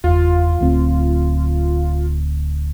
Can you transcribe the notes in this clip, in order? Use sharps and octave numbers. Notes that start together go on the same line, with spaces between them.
F#1 E2 F4
D1 D2 C4